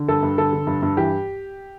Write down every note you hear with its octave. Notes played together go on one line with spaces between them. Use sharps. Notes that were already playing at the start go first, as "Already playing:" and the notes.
Already playing: D3
G2 A4
G2
D3 A4
D3
G2
G2
E3 G4